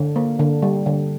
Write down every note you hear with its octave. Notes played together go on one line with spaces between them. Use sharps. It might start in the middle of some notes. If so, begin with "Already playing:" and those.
Already playing: D3
A#3
D3
G3
D3